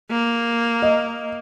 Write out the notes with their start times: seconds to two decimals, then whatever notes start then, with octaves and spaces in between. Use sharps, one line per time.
0.10 A#3
0.82 D#5